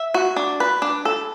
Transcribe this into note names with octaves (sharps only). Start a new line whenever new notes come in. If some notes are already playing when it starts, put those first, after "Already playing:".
Already playing: E5
F#4
D4
B4
D4
A4